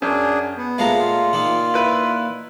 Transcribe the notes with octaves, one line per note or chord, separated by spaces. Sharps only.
F#2 D4 G#4
B3
A#2 G#3 A3 F5 A#5
F4
A#2 D#3 A#3
E4 B4